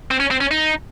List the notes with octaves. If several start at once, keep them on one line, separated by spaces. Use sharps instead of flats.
C4
C#4
C4
C#4
D#4